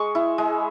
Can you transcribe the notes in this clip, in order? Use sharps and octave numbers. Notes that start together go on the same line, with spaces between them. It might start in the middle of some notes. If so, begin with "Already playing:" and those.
Already playing: G#3 C#6
E4
G#3